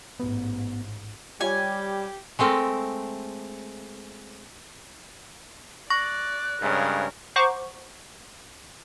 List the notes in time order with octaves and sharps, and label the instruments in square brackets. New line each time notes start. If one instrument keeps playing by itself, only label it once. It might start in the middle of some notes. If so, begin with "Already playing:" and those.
[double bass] A1 G#2 [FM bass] B3
[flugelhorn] G3 [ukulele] F4 C#5 [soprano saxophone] G4 [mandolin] G#5
[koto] G#3 A3 C4 A4 A#4
[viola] D5 [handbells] C#6 A#6 [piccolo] F#6
[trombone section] G2 C#3 G#3 [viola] A#4 C#5
[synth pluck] C5 F#5 A#5 C#6 D6